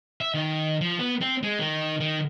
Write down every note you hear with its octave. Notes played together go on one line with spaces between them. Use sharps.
E5
D#3
F3
B3
C4
G#3
D#3
D#3